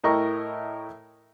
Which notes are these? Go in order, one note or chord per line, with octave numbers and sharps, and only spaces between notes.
A2 E4 A#4 D#5 G5 C#6